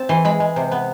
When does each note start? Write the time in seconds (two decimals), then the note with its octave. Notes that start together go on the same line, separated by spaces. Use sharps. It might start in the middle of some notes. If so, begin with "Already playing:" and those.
Already playing: C4 A5
0.09 E3 C6
0.25 G#3 B5
0.40 G#3
0.56 C3
0.71 B3